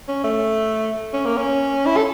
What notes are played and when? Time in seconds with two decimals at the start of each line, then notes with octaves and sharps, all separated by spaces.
0.08 C#4
0.24 A3
1.14 C#4
1.25 A#3
1.37 C#4
1.86 E4
1.97 A4